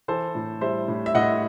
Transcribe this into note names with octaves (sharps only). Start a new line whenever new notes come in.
E3 A4 C5
A2
G3 C5 E5
A2
E5
A2 D#5 F#5